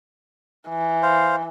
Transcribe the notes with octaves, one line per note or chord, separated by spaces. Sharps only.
E3
C5 F5